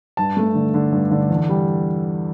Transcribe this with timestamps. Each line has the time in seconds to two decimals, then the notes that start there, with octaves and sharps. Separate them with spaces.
0.17 G2 A5
0.37 A3
0.55 D3
0.74 D3
0.92 G2
1.11 D3
1.30 E2
1.49 G3